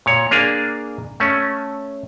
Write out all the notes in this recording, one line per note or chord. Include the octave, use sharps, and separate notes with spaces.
A#2 C#5
A#3 D4 G#4 F5
A3 C#4